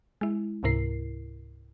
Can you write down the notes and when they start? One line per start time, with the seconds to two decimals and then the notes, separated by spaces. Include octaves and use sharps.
0.21 G#3 E4
0.63 C#2 G#2 C3 E4 A#4 C7